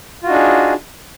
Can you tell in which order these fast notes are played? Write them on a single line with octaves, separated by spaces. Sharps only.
F4 F#4 D#4 D4 G#4